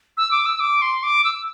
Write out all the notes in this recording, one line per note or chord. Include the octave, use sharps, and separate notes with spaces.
E6
D6
E6
D6
C6
D6
E6